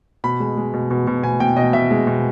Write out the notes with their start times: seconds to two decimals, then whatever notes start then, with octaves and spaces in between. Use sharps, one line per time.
0.24 B2 B5
0.40 G#3
0.57 G#3
0.74 B2
0.91 B2
1.07 B2
1.24 B2 G#5
1.40 B2 G5
1.57 B2 D#5
1.73 B2 E5
1.91 G#3
2.07 B2